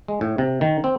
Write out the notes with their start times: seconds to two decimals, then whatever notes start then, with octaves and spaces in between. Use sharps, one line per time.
0.08 G#3
0.21 A2
0.38 C3
0.61 D#3
0.84 C4